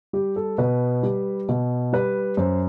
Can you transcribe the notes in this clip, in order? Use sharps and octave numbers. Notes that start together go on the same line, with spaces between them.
G3 G4
A4
B2 B4
G3
B2
G3 B4
F#2 C5